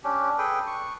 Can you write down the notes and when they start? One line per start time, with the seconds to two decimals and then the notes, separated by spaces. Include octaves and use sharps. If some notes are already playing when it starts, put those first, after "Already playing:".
0.04 C#4 D4 G4
0.38 G#4 A4 B4 G5
0.67 C#6